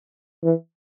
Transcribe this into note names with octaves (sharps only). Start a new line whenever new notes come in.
E3